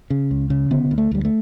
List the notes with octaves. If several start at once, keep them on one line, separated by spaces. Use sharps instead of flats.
C#3
C#2
C#3
D3 B3
D2
A3
D2 G3
A3